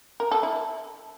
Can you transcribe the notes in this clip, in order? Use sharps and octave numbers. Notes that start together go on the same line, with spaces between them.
A#4
A4
E4